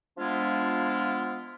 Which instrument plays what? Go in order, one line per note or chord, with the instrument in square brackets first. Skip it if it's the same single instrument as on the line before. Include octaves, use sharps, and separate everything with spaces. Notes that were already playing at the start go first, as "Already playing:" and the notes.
[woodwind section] F3 G#3 B3 D4 E4 F4